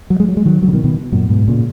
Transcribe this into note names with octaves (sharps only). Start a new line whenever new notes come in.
F#3
G#3
F#3
G#3
D#3 F#3
D#3 F#3
C#3
B2 D#3
B2 D#3
F#2 A#2
G#2 B2
A#2 C#3